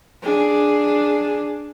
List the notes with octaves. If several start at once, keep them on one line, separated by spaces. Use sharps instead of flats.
D4 G#4